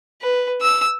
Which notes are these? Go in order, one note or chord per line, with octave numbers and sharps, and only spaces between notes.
B4
E6